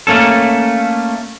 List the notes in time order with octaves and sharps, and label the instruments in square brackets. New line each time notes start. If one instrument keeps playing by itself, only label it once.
[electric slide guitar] A3 A#3 C#4 A4